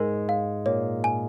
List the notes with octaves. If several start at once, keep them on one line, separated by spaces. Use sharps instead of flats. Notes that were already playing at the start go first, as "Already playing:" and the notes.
Already playing: G#2 G#3 A#4
F5
A#2 A#3 C#5
G#5